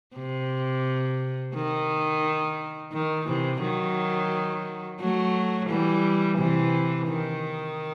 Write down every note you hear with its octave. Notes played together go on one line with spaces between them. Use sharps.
C3
D#3
D#3
C3 E3
D#3 F#3
F#3 A3
E3 G3
C3 E3
D#3